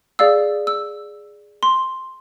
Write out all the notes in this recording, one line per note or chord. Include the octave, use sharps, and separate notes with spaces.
G#4 D5 F5 E6
E6
C6